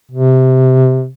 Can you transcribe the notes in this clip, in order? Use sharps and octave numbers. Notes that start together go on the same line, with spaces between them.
C3